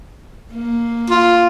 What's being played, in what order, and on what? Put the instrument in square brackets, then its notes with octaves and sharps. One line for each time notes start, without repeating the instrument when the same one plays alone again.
[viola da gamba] A#3
[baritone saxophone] F4